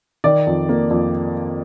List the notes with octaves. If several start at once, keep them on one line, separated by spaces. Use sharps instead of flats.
D#3 D5
F2
A#3
F2